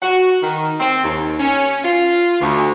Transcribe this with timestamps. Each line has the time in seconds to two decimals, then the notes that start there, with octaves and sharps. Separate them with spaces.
0.02 F#4
0.43 D#3
0.80 C4
1.04 D#2
1.40 C#4
1.84 F4
2.41 D2